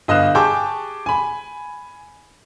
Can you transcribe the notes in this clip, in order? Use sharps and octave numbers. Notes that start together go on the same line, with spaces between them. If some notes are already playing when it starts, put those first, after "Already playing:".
G1 D#5 F5 D#6 F#6 E7
G4 G#4 G5 A5 C#6 D6
G#5 B5